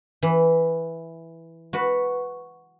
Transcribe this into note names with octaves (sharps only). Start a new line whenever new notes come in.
E3
F#4 B4